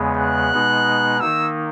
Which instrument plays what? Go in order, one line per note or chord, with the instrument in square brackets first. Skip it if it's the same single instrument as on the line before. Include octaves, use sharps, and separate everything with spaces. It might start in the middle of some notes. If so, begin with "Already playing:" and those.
Already playing: [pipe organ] E2 C#3 G#3 B3
[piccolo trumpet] F#6
[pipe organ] B2 G#3 B3 D#4
[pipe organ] D#3 A#3 D#4 [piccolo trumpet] E6